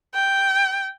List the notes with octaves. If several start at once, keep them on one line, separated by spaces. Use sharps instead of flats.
G5